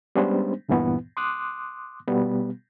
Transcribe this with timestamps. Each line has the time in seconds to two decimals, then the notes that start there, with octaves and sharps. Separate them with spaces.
0.15 G3 G#3 B3 C#4 D4 C5
0.69 D2 G2 A#2 E3 B3
1.17 C6 D6 D#6 F#6
2.08 B2 G3 B3